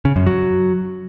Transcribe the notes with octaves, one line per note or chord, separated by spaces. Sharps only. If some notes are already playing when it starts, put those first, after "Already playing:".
C#3
F#2
F#3